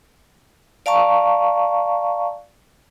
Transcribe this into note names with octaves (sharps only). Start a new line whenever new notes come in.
D5 F5 A5 A#5 C#6